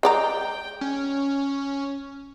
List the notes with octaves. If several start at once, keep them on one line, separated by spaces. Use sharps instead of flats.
G#3 D5 G5 A#5
C#4